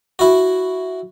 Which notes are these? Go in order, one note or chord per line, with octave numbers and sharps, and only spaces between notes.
E4 F#4